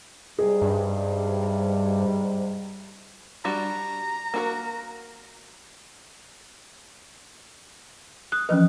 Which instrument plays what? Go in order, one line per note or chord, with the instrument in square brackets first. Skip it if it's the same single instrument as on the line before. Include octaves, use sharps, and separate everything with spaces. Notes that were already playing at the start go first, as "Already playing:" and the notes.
[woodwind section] G#2 C3 G3 [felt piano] G#4
[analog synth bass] G2
[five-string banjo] G3 D4 F#4 [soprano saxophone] A#5
[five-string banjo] A#3 F#4 A#4
[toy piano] D#6 [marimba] F#6
[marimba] E3 F3 D#5 [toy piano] C#4 B4